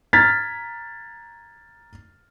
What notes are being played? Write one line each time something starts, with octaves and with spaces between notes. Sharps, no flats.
A#5 F6 G#6 A6 B6